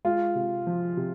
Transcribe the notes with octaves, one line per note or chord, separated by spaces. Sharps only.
G#3 F4
C3
F3
C3